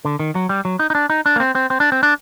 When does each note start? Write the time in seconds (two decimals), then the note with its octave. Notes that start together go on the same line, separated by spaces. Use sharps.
0.05 D3
0.20 D#3
0.35 F#3
0.49 G3
0.65 F#3
0.79 D#4
0.90 D#4
0.95 D4
1.10 D#4
1.26 D4
1.36 A#3
1.40 C4
1.55 C4
1.70 C4
1.80 D4
1.92 C4
2.03 D4